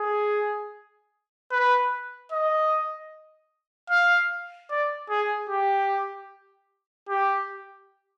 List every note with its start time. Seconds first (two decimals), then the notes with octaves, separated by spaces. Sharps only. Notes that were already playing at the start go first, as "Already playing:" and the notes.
Already playing: G#4
1.52 B4
2.32 D#5
3.90 F5
4.70 D5
5.10 G#4
5.50 G4
7.09 G4